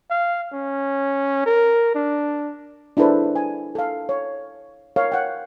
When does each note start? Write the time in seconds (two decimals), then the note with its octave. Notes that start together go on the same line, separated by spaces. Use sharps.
0.10 F5
0.53 C#4
1.46 A#4
1.95 D4
2.97 D4 E4 G#4 A4 B4 C5
3.36 G#5
3.75 A4 F5
4.09 C#5
4.96 A#4 C#5 F5
5.12 F#5 G5